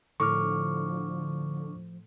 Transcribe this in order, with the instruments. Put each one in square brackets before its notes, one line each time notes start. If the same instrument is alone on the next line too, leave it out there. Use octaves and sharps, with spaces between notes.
[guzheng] A2 [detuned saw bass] D3 [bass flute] F3 [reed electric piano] C#6 D6 F6